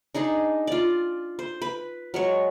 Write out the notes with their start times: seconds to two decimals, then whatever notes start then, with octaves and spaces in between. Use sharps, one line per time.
0.15 D4 D#4 G#4 D#5
0.67 F4 D5
1.39 C5
1.62 B4
2.14 F#3 G#3 C#5